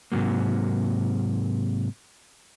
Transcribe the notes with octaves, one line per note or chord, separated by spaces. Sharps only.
G#2 C3 F#3 A#3